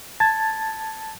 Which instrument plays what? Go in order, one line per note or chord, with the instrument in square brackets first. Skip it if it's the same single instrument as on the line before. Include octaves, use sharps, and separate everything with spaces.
[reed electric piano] A5 G#6 A6